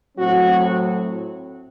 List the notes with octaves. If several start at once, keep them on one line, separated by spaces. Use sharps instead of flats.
A2 F#3 C4 F#4